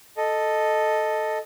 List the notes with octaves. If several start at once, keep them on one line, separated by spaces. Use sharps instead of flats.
A4 D#5